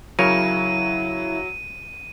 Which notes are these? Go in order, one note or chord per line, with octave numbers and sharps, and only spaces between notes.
C#3 F#3 E4 A#4 C#5 D#7